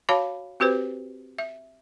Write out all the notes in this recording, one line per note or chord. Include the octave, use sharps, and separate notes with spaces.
F#4 C#5 F5 A5 B5
C4 F#4 G4 B4 C5
E5